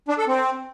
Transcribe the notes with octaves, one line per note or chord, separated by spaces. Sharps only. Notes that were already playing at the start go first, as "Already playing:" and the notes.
D4
A4
C4